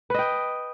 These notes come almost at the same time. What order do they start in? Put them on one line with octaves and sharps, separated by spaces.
B4 D#5 G5